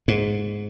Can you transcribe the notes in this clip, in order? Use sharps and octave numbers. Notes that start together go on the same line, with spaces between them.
G#2